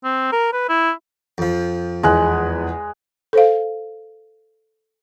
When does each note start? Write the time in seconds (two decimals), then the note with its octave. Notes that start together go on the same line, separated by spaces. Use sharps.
0.04 C4
0.32 A#4
0.53 B4
0.69 E4
1.38 F2 F3
2.03 E2 G#3 F#6
3.33 A4 C5 F5